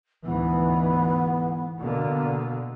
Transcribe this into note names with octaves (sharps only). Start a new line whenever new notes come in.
D2 G#2 E3 B3
B2 D3 A#3